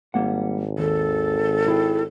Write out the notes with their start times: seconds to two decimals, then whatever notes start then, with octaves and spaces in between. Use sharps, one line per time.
0.14 G#1 G3 A#3 F#5
0.78 D#2 A4
1.68 E4 G#4 G5